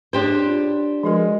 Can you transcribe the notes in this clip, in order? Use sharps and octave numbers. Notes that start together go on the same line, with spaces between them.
D4 G4 G#4 C5 C#5
F4
F3 G#3 F#4 A#4